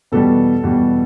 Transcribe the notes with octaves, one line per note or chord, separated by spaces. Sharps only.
E2 B2 G3 A4
E2 B2 G3